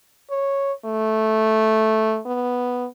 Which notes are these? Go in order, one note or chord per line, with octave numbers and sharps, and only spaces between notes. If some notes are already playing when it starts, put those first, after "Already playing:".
C#5
A3
B3